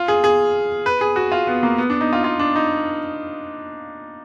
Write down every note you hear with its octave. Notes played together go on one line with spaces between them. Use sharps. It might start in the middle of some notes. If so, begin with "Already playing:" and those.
Already playing: F4
G#4
G#4
B4
G#4
F#4
F4
B3
A#3
B3
D4
D#4
F4
F4
D4
D#4